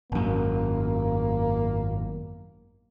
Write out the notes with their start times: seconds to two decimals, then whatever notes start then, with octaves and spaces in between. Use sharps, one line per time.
0.12 G#1 F#2 A#3